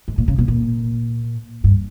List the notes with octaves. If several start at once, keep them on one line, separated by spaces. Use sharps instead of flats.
G#2
A#2
C#3
B2
A#2
G2